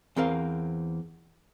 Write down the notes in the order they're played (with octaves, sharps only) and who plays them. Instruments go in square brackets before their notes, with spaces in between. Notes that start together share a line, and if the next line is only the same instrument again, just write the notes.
[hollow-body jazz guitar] E2 C4 A#4 F5